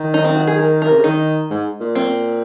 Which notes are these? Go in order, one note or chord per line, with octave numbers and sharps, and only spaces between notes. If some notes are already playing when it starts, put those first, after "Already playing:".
Already playing: D#3
D#4
C4
F#4
G#4
A#4
A#4
C3
C#3
D#3 D#4
G#2
A#2
C4